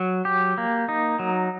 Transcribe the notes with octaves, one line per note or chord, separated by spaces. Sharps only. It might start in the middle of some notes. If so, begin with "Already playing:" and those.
Already playing: F#3
G4
A#3
D#4
F#3